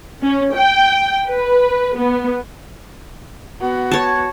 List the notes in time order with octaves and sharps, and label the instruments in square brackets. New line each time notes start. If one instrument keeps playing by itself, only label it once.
[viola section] C#4
G5
B4
B3
[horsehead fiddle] B3 F#4
[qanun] C#5 A5